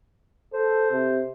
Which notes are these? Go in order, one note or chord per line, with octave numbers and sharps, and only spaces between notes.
A4 C5
C3